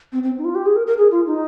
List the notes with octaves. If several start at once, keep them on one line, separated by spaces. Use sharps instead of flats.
C4
C4
D#4
F4
G4
G#4
A#4
A#4
G#4
F4
D#4